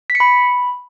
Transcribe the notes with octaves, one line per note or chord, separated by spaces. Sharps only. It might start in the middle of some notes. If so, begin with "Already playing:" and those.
B6
C#7
B5